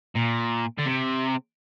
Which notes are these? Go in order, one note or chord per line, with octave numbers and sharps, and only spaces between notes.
A#2
D3
C3